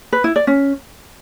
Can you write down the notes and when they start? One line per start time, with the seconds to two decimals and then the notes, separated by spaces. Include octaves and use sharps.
0.12 B4
0.24 E4
0.36 D5
0.47 C#4